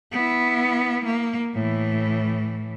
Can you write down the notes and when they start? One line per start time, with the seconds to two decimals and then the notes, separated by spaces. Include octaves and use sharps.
0.11 B3 E4
1.05 A#3
1.54 A2 E3